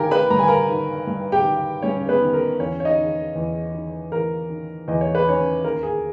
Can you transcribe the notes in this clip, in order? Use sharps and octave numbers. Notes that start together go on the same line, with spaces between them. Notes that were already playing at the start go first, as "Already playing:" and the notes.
Already playing: D#3 G4 A#4 G5 G#5 A#5
B4 B5
G2 A#5
G#5
A#4 A#5
D#3
G2
G4 G5
D#3
G2 C#4 C#5
B3 B4
D#3
A#4
E2 C#4 C#5
C#5
D#4 D#5
D#3
E2
D#3
E2 A#4
D#3
E2 D#5
C#5
B4
D#3 C#4 C#5
D#2 A#4
G#4